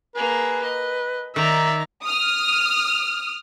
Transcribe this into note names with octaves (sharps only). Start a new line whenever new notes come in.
A#3 G#4 B4
D#5
D#3 D#4 D5 E5 A#5
D#6 F6